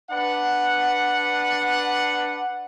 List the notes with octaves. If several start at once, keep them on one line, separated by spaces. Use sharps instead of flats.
D4 B4 F#5